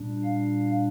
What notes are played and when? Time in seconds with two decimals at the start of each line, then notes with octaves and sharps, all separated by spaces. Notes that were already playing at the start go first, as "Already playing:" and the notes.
Already playing: A#2 G3 D4
0.24 F5